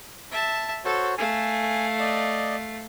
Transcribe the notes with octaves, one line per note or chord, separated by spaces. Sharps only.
E5 A5
F#4 A4 C5 C#5
A3 F5 G#5
D5 D#5